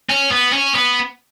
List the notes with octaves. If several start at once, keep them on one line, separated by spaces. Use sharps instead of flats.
C#4
B3
C#4
B3